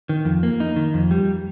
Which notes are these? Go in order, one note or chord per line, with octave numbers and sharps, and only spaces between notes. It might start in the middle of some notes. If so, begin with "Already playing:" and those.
D#3
F2
A#3
D#4
D#3
F2
G3